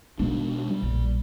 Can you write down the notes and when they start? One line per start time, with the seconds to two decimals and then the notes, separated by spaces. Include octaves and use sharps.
0.20 B2 G#3 B3 D4 D#4
0.69 G3
0.83 A#1